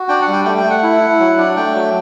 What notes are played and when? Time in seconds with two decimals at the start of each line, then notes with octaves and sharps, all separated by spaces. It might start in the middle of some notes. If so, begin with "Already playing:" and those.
Already playing: F#4
0.08 D4 G5
0.22 F#5
0.28 G3
0.33 G5
0.45 A3 G5
0.58 G5
0.64 A3
0.70 F#5
0.83 E4
1.00 E4
1.20 F#3
1.38 D4
1.57 A3 G5
1.75 F#3